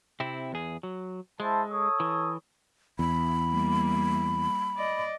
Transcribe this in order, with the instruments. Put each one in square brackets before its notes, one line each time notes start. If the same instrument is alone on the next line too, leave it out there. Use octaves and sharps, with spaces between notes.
[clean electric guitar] C3 C4 E4
E2 G#4
F#3
[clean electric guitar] G#3 [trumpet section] E4 C5 A5
[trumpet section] A4 C#5 D#6
[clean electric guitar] E3
[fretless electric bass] E2 [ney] B5
[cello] G3 A#3
D5 D#5